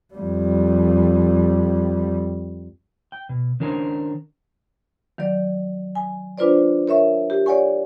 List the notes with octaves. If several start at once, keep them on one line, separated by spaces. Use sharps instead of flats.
F2 G3
G5
B2
D#3 C#4 D4 A#4 C5 G#5
D#3 F#3 D5
G#5
D4 F4 B4 C5 D5
A#4 C#5 E5 C#6
G4
C#5 D5 F#5 G#5 C#6